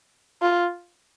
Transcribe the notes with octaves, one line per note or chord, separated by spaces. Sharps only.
F4